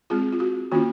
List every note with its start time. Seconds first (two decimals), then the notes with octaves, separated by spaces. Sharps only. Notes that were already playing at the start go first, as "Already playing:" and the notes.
0.10 G#3 C4 F4 G#4
0.32 F4
0.40 F#4
0.72 D#3 A#3 C#4 F4 F#4